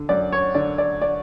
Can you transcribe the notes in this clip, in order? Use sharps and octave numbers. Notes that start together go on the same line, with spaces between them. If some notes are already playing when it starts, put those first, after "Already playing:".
Already playing: D3
F#2 D5
C#5
D3 D5
D5
D5